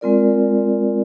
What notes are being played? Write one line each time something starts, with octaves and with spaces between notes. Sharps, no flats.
G#3 C4 F4 A#4 D5